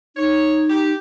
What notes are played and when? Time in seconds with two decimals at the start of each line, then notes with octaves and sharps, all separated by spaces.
0.16 D#4 C#5
0.70 G4